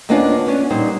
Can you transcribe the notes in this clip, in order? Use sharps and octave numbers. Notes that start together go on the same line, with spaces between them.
D#2 A#3 B3 C#4 D4 F4
B3 C#4 D4
A#2 G3 D#4 C5